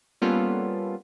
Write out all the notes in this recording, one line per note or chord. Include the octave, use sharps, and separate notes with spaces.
G3 A#3 B3 C#4 F4 A4